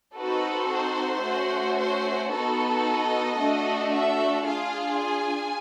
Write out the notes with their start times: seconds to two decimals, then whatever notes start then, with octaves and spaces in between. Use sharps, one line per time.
0.15 C4 D#4 F#4 A4 B4
0.69 C5
1.23 A3 C#4 F#4
1.77 C5
2.30 B3 D#4 F#4 A4
2.84 D#5
3.37 A3 D4 F#4 A4
3.91 E5
4.44 D4 F4 G#4 F5
4.98 G#5